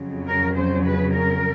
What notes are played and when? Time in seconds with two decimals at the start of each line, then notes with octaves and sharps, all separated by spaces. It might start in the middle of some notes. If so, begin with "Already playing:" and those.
Already playing: F2 C#3 F#3
0.28 A#4
0.56 C5
0.85 B4
1.13 A#4